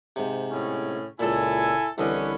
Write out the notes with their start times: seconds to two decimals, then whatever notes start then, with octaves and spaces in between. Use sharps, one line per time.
0.16 G#2 C3
0.51 A2 C#4
1.20 C#2 A#2 E4 A4 G#5
1.98 C2 D3 E3 C#4 B4 D#5